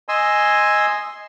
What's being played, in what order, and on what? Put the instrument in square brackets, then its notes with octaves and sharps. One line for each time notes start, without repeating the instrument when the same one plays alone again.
[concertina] D#5 G#5 C6 E6